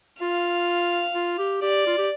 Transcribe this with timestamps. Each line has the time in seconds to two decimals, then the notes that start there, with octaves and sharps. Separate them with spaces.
0.20 F4 F5
1.14 F4
1.38 G4
1.62 G4 D5
1.87 F4
1.98 G4